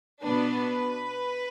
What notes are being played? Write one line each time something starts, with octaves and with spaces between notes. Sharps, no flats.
B2 B3 D4 B4